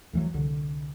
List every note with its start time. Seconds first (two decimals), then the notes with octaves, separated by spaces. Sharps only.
0.13 D2 E3 F#3
0.34 C2 D3